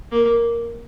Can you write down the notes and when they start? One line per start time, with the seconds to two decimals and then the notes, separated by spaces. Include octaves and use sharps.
0.12 A#3